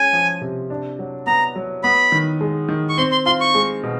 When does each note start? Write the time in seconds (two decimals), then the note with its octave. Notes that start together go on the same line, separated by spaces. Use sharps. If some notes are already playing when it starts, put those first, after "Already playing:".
Already playing: G#3 C#4 G#5
0.13 F3
0.41 C3
0.70 D4
0.99 F#3
1.26 B3 A#5
1.56 F#3
1.83 B3 B5
2.12 D#3
2.41 G#3
2.69 D#3
2.89 C#6
2.98 C4 C6
3.12 C6
3.26 F4 C6
3.41 C#6
3.55 G#3
3.83 B2